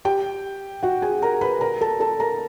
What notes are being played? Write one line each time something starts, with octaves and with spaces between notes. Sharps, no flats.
G4 G5
F#4 F#5
G#4 G#5
A#4 A#5
B4 B5
A#4 A#5
A4 A5
A4 A5
A#4 A#5